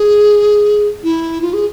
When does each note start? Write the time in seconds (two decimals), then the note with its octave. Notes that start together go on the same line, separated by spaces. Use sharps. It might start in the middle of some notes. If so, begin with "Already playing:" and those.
Already playing: G#4
1.03 E4
1.42 F4
1.53 G#4